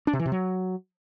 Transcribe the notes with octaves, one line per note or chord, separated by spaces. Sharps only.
D4
C3
E3
C3
F#3